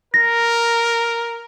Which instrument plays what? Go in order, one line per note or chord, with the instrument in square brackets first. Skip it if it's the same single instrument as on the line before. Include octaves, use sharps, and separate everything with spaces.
[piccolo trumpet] A#4 [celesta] A#6